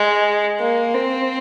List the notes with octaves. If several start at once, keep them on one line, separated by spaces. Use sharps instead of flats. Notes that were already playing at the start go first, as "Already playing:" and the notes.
Already playing: G#3
A#3
C4